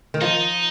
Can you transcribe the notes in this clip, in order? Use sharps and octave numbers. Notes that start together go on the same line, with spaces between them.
D#3
F3 D#4